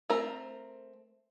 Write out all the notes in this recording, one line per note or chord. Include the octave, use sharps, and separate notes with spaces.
A3 C4 A#4 A#5